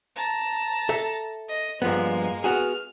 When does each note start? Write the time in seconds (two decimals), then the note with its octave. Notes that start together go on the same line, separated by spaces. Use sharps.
0.16 A5 A#5
0.89 A4 E5
1.49 D#5
1.82 G2 F3 G#3 A#3 B3
2.44 B3 F#4 G#4 F6